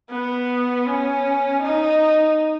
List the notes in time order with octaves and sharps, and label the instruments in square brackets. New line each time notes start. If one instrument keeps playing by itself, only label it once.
[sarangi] B3
C#4
D#4